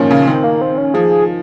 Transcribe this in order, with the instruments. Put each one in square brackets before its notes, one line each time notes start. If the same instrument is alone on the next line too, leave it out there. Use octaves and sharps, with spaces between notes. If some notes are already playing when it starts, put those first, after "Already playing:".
Already playing: [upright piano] A#2 D#3 F3 [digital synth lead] C#4
[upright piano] C#3
[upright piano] D#3 [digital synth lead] C4
[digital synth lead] A#3
C4
C#4
[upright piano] F3 [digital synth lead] G#4